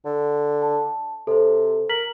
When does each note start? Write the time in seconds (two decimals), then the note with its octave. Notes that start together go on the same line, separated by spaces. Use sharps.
0.05 D3
0.62 A5
1.27 C3 A4 C5
1.90 A#4 B6 F#7